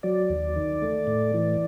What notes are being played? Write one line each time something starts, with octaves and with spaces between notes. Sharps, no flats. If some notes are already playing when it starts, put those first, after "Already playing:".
F#3 D5
D#2
D#3
A3
A2
E3